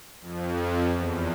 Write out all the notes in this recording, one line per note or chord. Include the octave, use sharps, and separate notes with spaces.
F2
E2